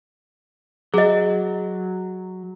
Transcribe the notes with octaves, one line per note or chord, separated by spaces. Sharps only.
F#3 G#4 D#5